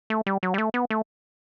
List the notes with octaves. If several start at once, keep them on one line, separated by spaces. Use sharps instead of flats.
A3
G3
F#3
G3
A3
B3
A3